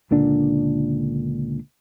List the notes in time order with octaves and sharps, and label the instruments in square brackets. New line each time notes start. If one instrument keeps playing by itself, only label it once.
[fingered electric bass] C#2 A#2 D3 D4